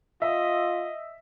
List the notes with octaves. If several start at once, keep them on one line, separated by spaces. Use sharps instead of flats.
F4 D#5 E5